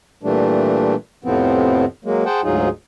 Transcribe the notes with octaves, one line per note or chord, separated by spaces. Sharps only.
A#2 E3 G3 A3 D4
F2 A2 C3 F3 B3 C4
F#3 G#3 A#3
G#4 C5 F#5 G5 A5
D2 G#2 F#3 D#4 F4 G#4